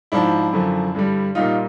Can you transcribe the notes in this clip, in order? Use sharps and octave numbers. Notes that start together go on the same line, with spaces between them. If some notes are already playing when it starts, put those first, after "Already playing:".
G#2 F3 D4 E4
F#2 D3 F3
G2 D3 G3
A#2 G3 D#4 F4